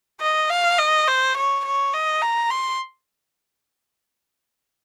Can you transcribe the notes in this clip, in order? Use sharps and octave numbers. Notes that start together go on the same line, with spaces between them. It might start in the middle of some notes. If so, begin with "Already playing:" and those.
D#5
F5
D#5
C5
C#5
C#5
D#5
A#5
C6